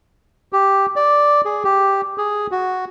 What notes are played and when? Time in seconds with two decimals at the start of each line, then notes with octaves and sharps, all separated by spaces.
0.53 G4
0.96 D5
1.45 G#4
1.64 G4
2.18 G#4
2.51 F#4